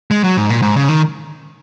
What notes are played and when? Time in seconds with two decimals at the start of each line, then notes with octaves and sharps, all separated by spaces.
0.11 G#3
0.24 F#3
0.37 G#2
0.50 A#2
0.62 G#2
0.76 C#3
0.89 D#3